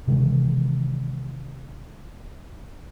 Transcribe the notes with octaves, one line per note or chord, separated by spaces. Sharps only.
C3 D#3 E3 G#3